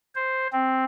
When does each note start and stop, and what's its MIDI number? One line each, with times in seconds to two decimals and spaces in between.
0.15 0.47 72
0.52 0.85 60